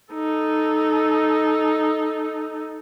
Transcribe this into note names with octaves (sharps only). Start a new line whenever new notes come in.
D#4 A4